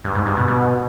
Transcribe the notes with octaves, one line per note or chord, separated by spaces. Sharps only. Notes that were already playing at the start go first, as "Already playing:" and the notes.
G2
G#2
G2
B2
B2